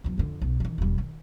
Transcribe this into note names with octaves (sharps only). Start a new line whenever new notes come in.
E2 F#3
F2 D3
B1
D#3 E3
E1 G3
D#3